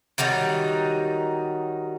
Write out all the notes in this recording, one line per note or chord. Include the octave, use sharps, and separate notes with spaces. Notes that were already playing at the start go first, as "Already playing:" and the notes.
D#3 F#3 G3 D#4